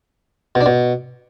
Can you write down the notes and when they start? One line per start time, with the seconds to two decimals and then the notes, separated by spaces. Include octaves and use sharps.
0.55 B2
0.61 D4
0.66 B2